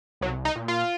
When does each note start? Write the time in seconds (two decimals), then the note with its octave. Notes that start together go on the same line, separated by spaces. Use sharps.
0.21 C2 F#3
0.45 D#4
0.56 A#2
0.68 F4